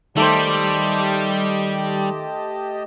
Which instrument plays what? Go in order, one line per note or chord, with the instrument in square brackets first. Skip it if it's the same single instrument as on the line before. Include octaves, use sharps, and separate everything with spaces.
[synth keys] D#3 D6 [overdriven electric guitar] G3 [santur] A3 C5 [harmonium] G4 D#5 A5